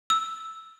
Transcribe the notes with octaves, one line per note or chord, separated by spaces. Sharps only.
E6